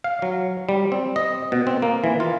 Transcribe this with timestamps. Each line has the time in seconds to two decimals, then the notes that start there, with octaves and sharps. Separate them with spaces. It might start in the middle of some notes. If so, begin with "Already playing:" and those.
0.04 F5
0.22 F#3
0.69 G3
0.92 C4
1.16 D#5
1.52 B2
1.67 C4
1.82 A#3
2.04 E3
2.20 F4